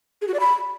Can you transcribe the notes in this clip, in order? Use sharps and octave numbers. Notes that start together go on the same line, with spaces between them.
G#4
F#4
D5
B5